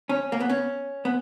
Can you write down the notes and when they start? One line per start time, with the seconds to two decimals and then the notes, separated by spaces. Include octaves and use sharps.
0.09 C#4
0.32 A#3
0.40 B3
0.49 C#4
1.05 B3